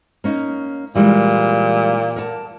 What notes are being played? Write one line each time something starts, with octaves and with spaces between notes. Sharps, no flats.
A#3 C#4 D#4
A#2 E3 G3 G#3
A#4 F#5 A5